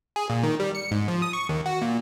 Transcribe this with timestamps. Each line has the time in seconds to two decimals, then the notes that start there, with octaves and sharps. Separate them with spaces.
0.16 G#4
0.30 A#2
0.43 D#3
0.60 G3
0.75 C#7
0.91 G#2
1.08 F3
1.22 D#6
1.33 C#6
1.49 D#2
1.66 F#4
1.82 A#2